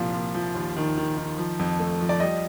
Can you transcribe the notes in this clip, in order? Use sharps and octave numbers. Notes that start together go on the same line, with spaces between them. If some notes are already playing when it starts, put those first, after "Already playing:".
Already playing: C2 A#2 F3 F5
A#2
F3
D#2
D#3
D#3
D#3
F3
F2
A3
F3
D5
G3 D#5